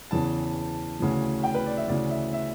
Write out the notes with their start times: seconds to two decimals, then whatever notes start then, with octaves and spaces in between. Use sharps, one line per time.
0.11 E2 C#3 E3 A5
1.00 D2 C#3 E3
1.43 G5
1.54 B4
1.66 D5
1.77 E5
1.87 D2 C#3 E3 D5
2.10 E5
2.33 E5